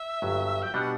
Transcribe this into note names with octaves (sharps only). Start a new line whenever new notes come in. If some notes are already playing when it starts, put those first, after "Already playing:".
Already playing: E5
G1 G2 F#3
G5
B2 G3 B3 D4 F#4 F#5